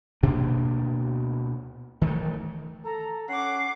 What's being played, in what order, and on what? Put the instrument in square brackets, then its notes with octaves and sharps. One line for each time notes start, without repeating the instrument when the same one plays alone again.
[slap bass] D2 B2 A#3 D4
D#3 E3 G#3 A3
[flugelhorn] A4 [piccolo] A#5
[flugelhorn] C#4 [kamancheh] F#5 D6 [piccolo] C7